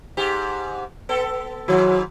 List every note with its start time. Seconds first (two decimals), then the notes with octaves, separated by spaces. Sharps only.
0.17 G#2 G4
1.09 B3 A4
1.68 G#2 D#3 F#3